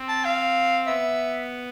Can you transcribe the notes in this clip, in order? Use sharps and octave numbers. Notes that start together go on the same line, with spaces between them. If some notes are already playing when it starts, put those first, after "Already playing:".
Already playing: C4
A5
F5
B3 E5